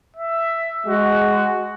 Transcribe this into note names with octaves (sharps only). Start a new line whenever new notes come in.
E5
G#3 F#4